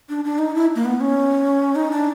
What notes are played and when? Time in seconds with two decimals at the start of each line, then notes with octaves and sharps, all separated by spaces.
0.09 D4
0.25 D4
0.39 D#4
0.55 E4
0.75 A#3
0.85 B3
1.00 C#4
1.75 D#4
1.91 D4